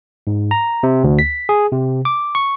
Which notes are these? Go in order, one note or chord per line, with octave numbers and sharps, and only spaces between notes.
G#2
A#5
C3
D2
B6
G#4
C3
D6
C#6